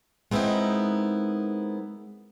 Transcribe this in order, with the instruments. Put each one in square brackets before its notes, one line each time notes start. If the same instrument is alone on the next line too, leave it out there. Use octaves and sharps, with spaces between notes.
[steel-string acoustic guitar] G#3 B3 C4 D#4 E4 A#4